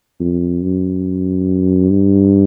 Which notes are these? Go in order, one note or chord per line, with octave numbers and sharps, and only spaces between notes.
F2
F#2
G2